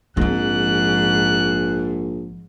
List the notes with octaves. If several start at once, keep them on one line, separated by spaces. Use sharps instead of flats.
A#1 G#2 F3 C4 F#6